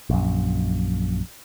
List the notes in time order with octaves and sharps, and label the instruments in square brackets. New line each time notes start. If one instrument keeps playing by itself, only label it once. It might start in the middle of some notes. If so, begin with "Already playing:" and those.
[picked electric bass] A#1 F#2